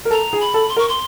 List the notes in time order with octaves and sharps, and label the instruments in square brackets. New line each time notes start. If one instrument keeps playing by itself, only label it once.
[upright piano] A#4
[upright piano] A4 [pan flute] A#5
[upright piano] G#4
[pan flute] B5
[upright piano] A4
[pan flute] C6
[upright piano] A#4 [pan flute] C#6
[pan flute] C6